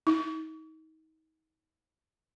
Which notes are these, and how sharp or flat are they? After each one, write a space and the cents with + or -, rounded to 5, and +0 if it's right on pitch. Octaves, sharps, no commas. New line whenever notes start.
D#4 +30